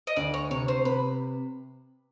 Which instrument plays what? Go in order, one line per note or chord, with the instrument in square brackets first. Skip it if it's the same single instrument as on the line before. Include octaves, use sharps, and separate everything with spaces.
[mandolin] D#5
[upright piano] D2 [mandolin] D5
[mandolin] C#5
[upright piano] C3 [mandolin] C#5
[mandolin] C5
[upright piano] C3 [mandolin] B4